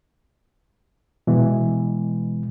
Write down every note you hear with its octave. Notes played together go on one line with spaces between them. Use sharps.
B2 E3 G#3